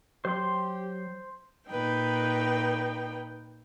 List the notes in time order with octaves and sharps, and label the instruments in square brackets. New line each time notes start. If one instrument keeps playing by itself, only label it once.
[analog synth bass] F#3 [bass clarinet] G4 [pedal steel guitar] C5 C6
[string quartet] A#2 D#4 B4 G5